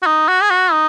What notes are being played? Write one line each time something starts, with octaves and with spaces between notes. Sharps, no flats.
F#4
D#4
F#4
G#4
F#4
D#4